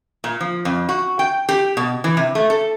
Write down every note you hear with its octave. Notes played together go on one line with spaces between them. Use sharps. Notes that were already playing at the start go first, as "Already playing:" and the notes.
A#2
F3
F2
F#4
G5
G4
B2
E3
C3
A3
A4